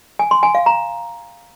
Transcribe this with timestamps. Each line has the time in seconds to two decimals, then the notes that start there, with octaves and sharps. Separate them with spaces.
0.19 G#5
0.31 C6
0.43 G#5
0.55 F5
0.66 A#5